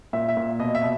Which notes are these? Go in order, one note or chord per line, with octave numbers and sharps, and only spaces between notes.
A#2 E5
E5
A#2
B2 D#5
E5
B2